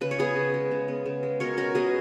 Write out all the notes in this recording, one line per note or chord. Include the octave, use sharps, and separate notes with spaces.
C#3 B4
C#5
B3 G#4 B4
C#3
G#3
C#3
B3
C#3
G#3
B2 A#4 C#5
C#4 F#4 A#4
B2 G#4 B4